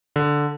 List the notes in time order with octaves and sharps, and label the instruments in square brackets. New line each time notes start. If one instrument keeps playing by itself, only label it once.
[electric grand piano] D3